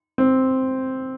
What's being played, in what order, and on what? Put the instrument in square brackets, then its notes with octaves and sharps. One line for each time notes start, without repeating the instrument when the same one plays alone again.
[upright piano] C4